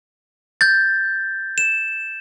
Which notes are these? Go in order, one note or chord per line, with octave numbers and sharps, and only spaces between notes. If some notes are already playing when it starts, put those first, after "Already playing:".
G6 A6
E7